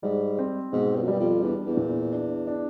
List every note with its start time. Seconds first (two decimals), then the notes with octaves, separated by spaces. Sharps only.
0.03 G#2 G3
0.38 C4
0.73 G#2 B2
0.96 G2
1.03 F#2
1.08 G2 G3
1.19 F2
1.42 E2 D4
1.65 E2
1.77 A#2
2.12 D4
2.47 D4